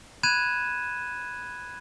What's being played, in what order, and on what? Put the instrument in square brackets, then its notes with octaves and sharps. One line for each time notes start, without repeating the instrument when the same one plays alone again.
[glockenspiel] B5 F#6 G#6 D#7 E7